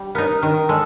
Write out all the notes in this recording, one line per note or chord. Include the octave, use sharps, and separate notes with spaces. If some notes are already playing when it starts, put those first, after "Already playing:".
Already playing: G3
B3 D#4 A#4
D#3 A#4
G#3 A4